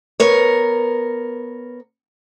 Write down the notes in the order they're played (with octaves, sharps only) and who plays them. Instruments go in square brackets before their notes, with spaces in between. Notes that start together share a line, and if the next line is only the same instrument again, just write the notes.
[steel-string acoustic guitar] B3 A#4 C#5